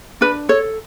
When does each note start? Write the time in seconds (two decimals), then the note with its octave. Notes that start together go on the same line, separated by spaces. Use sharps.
0.21 D4 B4
0.49 A4 C#5